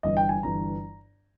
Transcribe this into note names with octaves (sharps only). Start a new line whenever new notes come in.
G1 G2 E3 D#5
G5
G#5
G1 G2 E3 A#5